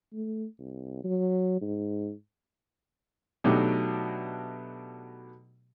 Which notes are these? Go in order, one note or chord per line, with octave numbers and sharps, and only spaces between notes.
A3
C2
F#3
G#2
B2 F#3 A3 D4 D#4 G4